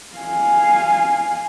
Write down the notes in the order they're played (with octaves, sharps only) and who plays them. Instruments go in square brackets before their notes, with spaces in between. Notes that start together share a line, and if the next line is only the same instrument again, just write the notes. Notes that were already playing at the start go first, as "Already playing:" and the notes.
[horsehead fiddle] F5 G#5